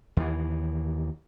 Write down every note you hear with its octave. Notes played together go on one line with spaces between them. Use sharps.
D#2 E3